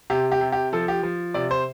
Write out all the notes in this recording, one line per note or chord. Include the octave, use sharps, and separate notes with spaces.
C3 G4
G4
C3
G4
F3 A4
G4
F3
C3 D5
C5